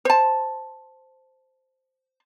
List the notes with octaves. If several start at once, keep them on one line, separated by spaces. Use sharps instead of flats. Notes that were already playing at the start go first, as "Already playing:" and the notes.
C5 A5